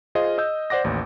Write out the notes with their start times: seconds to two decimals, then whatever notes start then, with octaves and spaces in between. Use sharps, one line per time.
0.15 F4 G#4 C5 D#5 F5
0.38 D#5 E6 G6
0.70 C5 D5 F#5 D6 A#6
0.84 A1 D#2